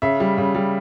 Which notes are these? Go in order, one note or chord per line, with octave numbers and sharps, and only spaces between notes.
C#3 E5
G3
C#3
G3